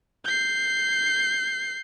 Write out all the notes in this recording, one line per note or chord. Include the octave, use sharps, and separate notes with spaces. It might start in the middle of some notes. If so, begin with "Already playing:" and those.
G6 C7